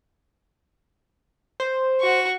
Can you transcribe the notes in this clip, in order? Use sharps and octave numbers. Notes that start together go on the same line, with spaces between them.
C5
F#4 C#6